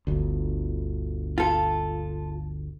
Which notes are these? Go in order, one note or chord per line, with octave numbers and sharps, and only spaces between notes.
G1 D2
F4 A4